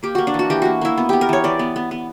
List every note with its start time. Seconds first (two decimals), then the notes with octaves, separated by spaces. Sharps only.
0.03 A#3 G4
0.15 A#3 F#4
0.27 D4
0.34 E3
0.39 F#4
0.50 E3 G4
0.62 A#3 F#4
0.81 A#3 E4
0.98 B3
1.09 B3 G4
1.21 A#4
1.29 E3 C#5
1.44 E3 D5
1.59 B3
1.76 B3
1.91 B3